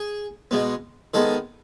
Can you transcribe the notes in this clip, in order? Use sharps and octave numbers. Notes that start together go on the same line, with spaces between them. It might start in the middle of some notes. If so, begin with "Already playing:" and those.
Already playing: G#4
B2 G#3 B3
D#3 G#3 B3 A4